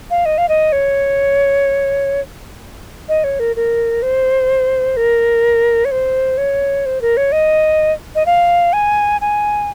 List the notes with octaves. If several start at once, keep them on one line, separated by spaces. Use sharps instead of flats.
F5
D#5
F5
D#5
C#5
D#5
C#5
A#4
A#4
C5
A#4
C#5
C5
C#5
C5
A#4
C#5
D#5
D#5
F5
G#5
G#5